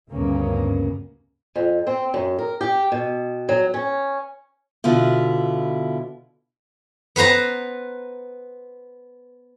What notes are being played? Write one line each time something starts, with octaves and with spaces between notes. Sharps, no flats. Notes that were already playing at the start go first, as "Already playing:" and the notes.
D2 G2 C#3 A#3 B3 C#4
F2
C4
F#2
A#4
G4
B2
F#3
C#4
B2 D3 E4 F4
B3 B4 C5 A#5